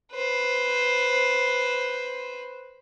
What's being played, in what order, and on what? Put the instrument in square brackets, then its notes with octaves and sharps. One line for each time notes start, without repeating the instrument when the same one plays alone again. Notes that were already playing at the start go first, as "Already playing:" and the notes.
[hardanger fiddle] B4 C5